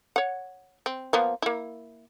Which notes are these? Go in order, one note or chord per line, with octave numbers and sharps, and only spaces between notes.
C#5 F#5
C4
F3 A#3 B3
A#3 E4